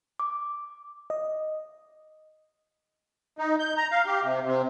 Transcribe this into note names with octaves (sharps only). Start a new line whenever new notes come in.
D6
D#5
D#4
G6
A#5
F5
G4
C3
C3